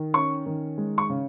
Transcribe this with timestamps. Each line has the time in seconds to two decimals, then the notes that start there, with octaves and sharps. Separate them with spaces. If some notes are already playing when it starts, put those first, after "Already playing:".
Already playing: D#3
0.14 C#4 C#6
0.46 D#3
0.78 G#3
0.98 C#6
1.09 C#3